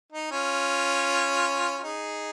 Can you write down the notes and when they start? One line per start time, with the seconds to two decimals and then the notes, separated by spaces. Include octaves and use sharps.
0.12 D#4
0.31 C#4 F4
1.78 F4
1.83 D#4 G#4